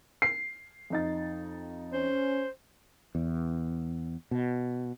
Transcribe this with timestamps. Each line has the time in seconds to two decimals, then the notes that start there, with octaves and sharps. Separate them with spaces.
0.22 C7
0.90 F2 D#4 A6
1.93 C#4 C5
3.15 E2
4.31 B2